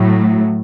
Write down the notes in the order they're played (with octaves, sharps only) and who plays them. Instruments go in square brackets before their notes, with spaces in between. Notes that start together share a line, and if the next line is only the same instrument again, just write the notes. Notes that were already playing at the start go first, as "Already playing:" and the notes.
Already playing: [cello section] A2 F#3 A3